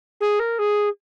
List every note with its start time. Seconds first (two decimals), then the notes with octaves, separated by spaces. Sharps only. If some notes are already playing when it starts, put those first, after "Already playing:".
0.20 G#4
0.39 A#4
0.58 G#4